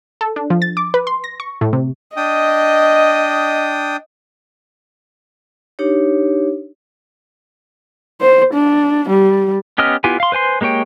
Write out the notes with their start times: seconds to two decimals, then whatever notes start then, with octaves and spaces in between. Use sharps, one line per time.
0.21 A4
0.36 D4
0.50 F3
0.62 A6
0.77 D6
0.94 B4
1.07 C6
1.24 A#6
1.40 C#6
1.61 A2
1.73 C3
2.17 D4 D#5 G5 D#6
5.79 D4 D#4 G4 C#5
8.21 C5
8.54 D4
9.09 G3
9.78 B3 C#4 G4 D#5 F6
10.04 B3 E4 F4 G4 G#5
10.20 F5 C6
10.32 B4 C5 G#5 C6
10.61 G#3 A#3 G4 C#5 G5